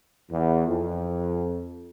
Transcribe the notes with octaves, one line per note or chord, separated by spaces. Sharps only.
E2
F2